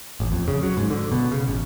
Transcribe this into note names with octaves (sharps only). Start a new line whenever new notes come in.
A1
F2
C#3
F#3
G#2
D3
B2
C#3
A1